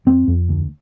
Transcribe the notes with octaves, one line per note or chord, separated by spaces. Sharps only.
F2 C4
F2
D2